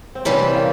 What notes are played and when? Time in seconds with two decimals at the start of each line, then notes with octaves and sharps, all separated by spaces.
0.15 C4
0.25 C3 E3 G3 C#4
0.40 C4
0.55 A#3